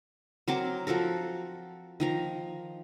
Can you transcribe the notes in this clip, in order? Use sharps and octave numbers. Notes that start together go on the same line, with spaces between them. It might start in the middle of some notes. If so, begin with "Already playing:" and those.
F#3 C4 A#4 D6
F3 F#4 A4 A#4
D#3 F3 A#5